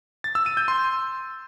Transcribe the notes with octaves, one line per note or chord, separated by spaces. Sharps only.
A6
E6
D#7
G6
C6